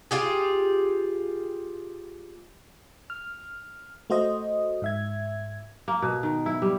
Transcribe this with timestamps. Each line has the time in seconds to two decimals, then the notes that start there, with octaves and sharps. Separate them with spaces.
0.11 F4 G4 G#4
3.10 F6
4.10 A3 F#4 C5 D#5
4.82 G#2 E5 G#6
5.88 A#3
6.02 B2
6.23 D#3
6.46 E4
6.62 G3